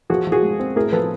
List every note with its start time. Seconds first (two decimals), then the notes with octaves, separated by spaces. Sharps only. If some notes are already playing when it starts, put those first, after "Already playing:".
0.10 F3 F#4 G#4
0.27 F3
0.32 F#4 G#4
0.43 G#3
0.59 C4
0.76 A2 G#4 A#4
0.92 F3 A4 B4